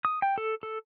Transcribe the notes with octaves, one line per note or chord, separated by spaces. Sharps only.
D#6
G5
A4
A4